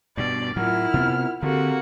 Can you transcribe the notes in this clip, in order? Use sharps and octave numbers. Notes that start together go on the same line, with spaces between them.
G2 B2 D5
A2 F#3 E4 F4 A#4 F#5 F6
C3 B3
D3 A#3 C4 F#4 G4 A4